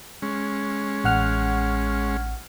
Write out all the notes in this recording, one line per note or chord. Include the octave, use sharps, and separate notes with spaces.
G#3 C#4
A1 F#5 F6